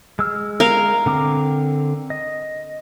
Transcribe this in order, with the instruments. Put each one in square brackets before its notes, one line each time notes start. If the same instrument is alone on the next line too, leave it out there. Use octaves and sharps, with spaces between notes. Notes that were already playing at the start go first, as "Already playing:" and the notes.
[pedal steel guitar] G#3 E6 F6
[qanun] A#4 F5
[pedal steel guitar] D3 C4 D6
D#5